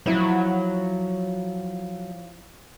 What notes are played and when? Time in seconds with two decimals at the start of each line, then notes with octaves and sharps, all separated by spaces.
0.06 F3 F#3 E4